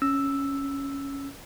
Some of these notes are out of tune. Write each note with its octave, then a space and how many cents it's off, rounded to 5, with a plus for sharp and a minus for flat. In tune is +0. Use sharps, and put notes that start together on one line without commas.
C#4 +0 E6 +0